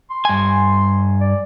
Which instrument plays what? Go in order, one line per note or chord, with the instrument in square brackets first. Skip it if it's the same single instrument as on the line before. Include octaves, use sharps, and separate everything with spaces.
[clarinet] C6
[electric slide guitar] G2 G#5
[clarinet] D5